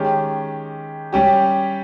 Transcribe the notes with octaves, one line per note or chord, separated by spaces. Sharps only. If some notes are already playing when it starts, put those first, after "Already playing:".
Already playing: D#3 G#3 C#4 G4
G3 C#4 G4